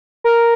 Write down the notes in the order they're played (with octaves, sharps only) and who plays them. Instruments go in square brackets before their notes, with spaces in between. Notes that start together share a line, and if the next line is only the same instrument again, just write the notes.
[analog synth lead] A#4